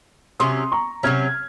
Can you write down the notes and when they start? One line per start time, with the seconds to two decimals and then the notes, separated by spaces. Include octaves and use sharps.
0.40 C3 F#3 C#4 C6 D#6
0.72 A#5 C#6
1.03 C3 F#3 C#4 F6 G#6